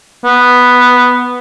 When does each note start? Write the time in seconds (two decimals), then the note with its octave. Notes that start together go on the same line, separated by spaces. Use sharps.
0.25 B3